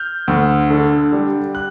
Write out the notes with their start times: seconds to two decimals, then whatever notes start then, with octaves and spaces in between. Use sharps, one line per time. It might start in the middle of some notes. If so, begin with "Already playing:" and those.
Already playing: F6 G6
0.28 D2
0.70 D3
1.13 G3
1.55 F#6